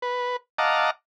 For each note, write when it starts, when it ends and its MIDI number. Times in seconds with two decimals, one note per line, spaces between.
0.02 0.36 71
0.58 0.90 75
0.58 0.90 77
0.58 0.90 78
0.58 0.90 81
0.58 0.90 82
0.58 0.90 86